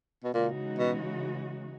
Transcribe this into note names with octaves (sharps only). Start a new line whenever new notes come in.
B2
A#2 C#3 E3 G#3 D#4 F#4
B2